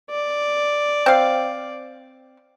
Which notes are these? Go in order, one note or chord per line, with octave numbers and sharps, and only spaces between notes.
D5
C4 F5